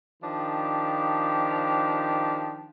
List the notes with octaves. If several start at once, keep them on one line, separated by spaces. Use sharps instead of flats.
D#3 F3 D4 G4